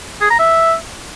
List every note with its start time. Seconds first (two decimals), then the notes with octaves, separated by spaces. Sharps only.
0.21 G#4
0.30 A#5
0.39 E5